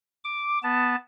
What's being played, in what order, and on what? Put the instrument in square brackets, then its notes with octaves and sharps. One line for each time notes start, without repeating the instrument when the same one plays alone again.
[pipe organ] D6
B3 A5